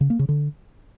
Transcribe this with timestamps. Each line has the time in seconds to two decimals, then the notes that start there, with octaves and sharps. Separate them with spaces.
0.01 C#3
0.10 A#3
0.19 C#3
0.29 D3